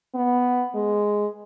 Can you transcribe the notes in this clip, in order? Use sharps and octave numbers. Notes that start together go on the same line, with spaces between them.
B3
G#3